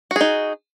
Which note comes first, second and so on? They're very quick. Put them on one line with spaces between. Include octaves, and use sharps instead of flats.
F#4 G#4 D#4